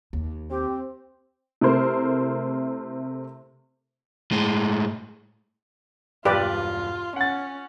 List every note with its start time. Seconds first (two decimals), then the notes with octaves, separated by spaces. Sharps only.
0.13 D#2
0.50 C4 G4
1.61 C3 A3 E4 A#4 C5
4.31 A2 G#3
6.25 E1 G2 F4 G4 B4 D5
7.16 C#4 F#5 A6